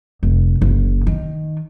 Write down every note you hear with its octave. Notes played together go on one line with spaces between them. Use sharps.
F1
F#1
D#3